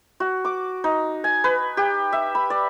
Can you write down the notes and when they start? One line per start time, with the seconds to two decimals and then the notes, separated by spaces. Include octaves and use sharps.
0.20 F#4
0.45 D6
0.84 D#4
1.24 G#5
1.44 B4
1.77 G4
2.12 E5
2.35 B5
2.50 D5